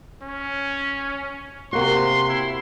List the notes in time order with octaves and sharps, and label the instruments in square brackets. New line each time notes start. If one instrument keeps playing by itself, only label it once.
[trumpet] C#4
[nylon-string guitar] C3 A#3 F#4 [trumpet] C6
[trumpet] E4